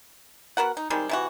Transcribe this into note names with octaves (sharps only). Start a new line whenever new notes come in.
B3 F#4 A#4 F#5
D#4
D#3 G3 G#3 C4
C3 E3 F#4